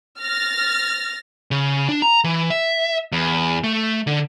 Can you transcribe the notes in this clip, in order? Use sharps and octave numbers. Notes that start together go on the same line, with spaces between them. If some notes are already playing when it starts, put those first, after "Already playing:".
F6 A6 A#6
C#3
D4
A#5
E3
E5
E2
A3
D3